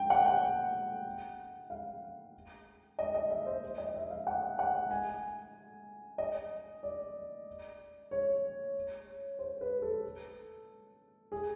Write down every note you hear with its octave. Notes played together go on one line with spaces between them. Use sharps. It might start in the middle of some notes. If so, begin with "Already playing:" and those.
Already playing: G5
F#5
F#5
F5
D#5
D#5
E5
C5
D#5
E5
F5
F#5
F#5
G#5
D#5
D5
C#5
C5
B4
A4
G#4